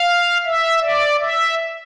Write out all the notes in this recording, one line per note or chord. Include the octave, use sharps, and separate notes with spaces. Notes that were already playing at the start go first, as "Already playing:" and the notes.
Already playing: F5
E5
D5
E5